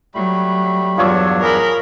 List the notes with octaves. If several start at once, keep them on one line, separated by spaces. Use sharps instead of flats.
F#3 G3 A3 B5
E2 G2 F3 F#3 D4 C#5 E6
G#4 A#4 B5